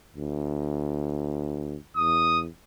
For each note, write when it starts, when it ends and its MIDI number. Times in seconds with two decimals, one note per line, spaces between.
0.16 1.76 38
1.96 2.47 40
1.96 2.40 87